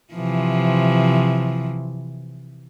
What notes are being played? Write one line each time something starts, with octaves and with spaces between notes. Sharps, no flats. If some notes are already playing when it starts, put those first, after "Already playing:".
C3 E3 F3